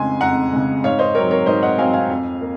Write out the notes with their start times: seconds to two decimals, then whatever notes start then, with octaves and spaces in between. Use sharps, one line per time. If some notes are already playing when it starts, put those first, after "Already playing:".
Already playing: F2 C#3 G#3 G#5 C6
0.21 F2 F#5 A#5
0.52 C#3 G#3
0.84 G#2 C#5 F5
0.99 C5 D#5
1.15 F#3 C4 A#4 C#5
1.31 A#4 C#5
1.46 G#2 C5 D#5
1.63 D#5 F#5
1.78 F#3 C4 F5 G#5
1.93 F5 G#5
2.10 F2
2.41 A#3